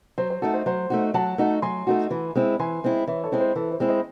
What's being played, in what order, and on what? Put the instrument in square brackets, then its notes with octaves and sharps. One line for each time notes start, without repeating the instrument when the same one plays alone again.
[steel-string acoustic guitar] F#3 [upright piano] C5
[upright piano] C5
[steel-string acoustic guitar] A3 D#4 F#4 [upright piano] A4
[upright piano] C5
[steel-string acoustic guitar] F#3 [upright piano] C5
[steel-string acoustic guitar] A3 D#4 F#4
[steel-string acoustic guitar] F#3 [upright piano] F#5 A5
[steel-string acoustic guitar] A3 D#4 F#4
[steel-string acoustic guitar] F#3 [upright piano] G#5 C6
[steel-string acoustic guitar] A3 D#4 F#4
E3
G#3 C4 E4
[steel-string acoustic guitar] E3 [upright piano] G#5 C6
[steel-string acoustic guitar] G#3 C4 E4
[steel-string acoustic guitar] E3 [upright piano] C#5 E5
[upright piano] A4 C#5
[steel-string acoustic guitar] G#3 C4 E4
[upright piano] C5
[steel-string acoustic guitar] E3 [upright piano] A4
[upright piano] C5
[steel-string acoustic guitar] G#3 C4 E4
[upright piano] C5 D#5